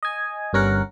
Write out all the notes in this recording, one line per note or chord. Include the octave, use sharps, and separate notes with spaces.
D#5 G#5
G1 G2 C#4 A#4 F#5